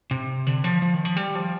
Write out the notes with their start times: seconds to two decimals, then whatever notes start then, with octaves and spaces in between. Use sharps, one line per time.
0.11 C3
0.47 D3
0.64 F3
0.82 F3
0.94 D#3
1.05 F3
1.17 G3
1.35 F3